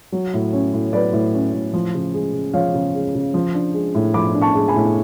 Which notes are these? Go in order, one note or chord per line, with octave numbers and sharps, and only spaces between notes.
F#3
A2
C#4
A2
F#3 B4 D5
A2
C#4
A2
F3
C#3
G#3
C#3
F3 C#5 F5
C#3
G#3
C#3
F3
D4
G#3
A2
F3 B5 D6
D4
A5 C#6
G#3
G#5 B5
A2